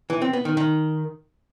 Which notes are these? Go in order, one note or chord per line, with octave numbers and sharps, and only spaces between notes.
E3
C4
B3
D#3
D#3